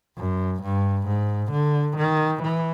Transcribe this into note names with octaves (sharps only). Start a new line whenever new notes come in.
F#2
G2
G#2
D3
D#3
E3